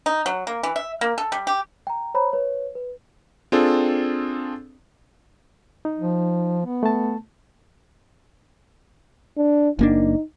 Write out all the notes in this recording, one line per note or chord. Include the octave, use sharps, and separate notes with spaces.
D#4
F#3
A#3
E3
E5
A#3
A4
G3
G4
G5 A#5
C5 C#5 A#5 B5
B4 C#5
B4
C4 D4 F4 G#4 A4
D#4
F3
B3
A3 A5
D4
F#1 A#3 D4 D#4